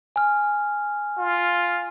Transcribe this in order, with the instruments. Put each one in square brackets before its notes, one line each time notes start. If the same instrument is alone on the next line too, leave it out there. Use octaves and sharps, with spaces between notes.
[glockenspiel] G#5 F6
[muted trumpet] F4